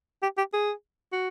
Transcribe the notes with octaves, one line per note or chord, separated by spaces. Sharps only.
G4
G4
G#4
F#4